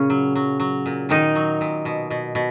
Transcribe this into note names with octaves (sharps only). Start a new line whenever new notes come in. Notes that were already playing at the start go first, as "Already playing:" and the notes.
Already playing: A#2 C#3 C#4
F#3
F#3
F#3
A#2
A#2 D#3 D#4
F#3
A#2
B2
B2
B2